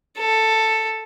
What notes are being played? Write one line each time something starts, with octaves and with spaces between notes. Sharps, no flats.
A4